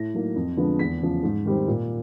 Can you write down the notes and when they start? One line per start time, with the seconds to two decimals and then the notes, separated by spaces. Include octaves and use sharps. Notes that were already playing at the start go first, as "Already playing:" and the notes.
Already playing: A2 A#6
0.14 F#3 A#3 D#4
0.36 F2
0.57 D3 F3 G#3 B3
0.79 E2 B6
1.02 C#3 F3
1.23 G#2
1.45 D#3 G3 C4
1.68 A#2